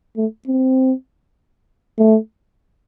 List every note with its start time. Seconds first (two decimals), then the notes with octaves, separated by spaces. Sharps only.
0.17 A3
0.47 C4
1.99 A3